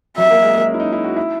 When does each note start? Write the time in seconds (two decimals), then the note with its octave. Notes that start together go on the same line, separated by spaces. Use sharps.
0.17 F#3 E5
0.30 A#3
0.42 G#3
0.55 A#3
0.67 C#4
0.74 E4
0.80 D#4
0.93 E4
1.04 F#4
1.17 E4